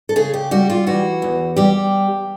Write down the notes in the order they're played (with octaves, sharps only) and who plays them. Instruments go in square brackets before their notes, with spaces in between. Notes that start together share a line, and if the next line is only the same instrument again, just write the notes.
[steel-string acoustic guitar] A4
C#3 G#4
G4
G3 F#4
F4
E3 F#4
E2
G3 G4